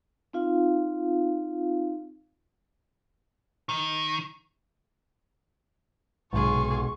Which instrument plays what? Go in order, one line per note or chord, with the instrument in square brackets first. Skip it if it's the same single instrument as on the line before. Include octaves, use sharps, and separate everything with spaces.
[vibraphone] C4 D#4 F4 F5
[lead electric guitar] D#3
[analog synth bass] B1 [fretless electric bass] G#2 C3 [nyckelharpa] F4 G#4 [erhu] C#6